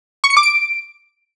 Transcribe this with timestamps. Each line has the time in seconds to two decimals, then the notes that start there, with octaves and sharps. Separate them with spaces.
0.24 C#6
0.30 C#7
0.37 D6
0.43 D7